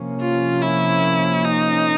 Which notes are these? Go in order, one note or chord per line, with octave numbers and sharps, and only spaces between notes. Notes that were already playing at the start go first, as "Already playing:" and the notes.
Already playing: C3 F3 A#3 C#4
F4
E4
D#4